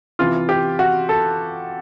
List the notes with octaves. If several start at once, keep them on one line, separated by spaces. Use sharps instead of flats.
C3 E3 F4
G4
F#4
A4